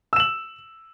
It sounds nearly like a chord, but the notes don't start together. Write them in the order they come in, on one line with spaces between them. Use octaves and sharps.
E6 E7 F#7